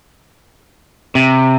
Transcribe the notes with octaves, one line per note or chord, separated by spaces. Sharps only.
C3